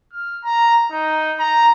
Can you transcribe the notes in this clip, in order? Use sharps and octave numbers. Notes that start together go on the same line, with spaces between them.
F6
A#5
D#4
A#5